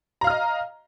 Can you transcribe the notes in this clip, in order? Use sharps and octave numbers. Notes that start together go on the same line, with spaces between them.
D#5 F5 A#5 F6